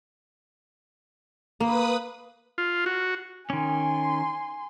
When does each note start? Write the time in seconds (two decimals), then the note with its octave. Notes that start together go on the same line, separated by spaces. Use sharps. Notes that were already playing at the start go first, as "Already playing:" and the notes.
1.60 A#3 B4 B5 D#6
2.58 F4
2.86 F#4
3.50 D#3 C#4 G#5 C6